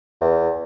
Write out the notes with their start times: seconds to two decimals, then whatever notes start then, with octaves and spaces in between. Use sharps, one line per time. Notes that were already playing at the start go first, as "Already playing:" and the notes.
0.21 E2